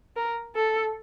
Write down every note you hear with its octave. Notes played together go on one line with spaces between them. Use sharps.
A#4
A4